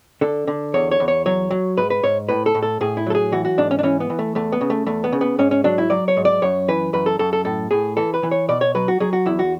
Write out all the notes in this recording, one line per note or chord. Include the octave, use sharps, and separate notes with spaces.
D3 A4
D3
E2 C#5
C#5
E2
C#5
F#3 C#5
F#3
G#2 B4
B4
G#2 C#5
A2 B4
A4
A2
A4
A2 G#4
E4
F#3 A4
G#4
E3 F#4
F#4
G#2 D4
C#4
D4
E3 C#4
B3
E3
A3
E2 A3
B3
C#3
A3
E2 A3
B3
C#3
B3
G#2 C#4
C#4
F#3 D4
E4
F#3 D5
C#5
G#2
D5
F#2 C#5
E3 B4
F#2 B4
A4
F#2 A4
A4
A2 A4
A2 G#4
E3 A4
B4
E3
C#5
B2 D5
C#5
F#3 B4
F#4
F#3 G#4
F#4
E2 E4
F#4